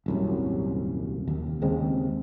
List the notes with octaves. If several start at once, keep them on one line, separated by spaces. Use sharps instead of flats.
D#1 C2 F#2
D#2
D#2 C#3 G#3 C4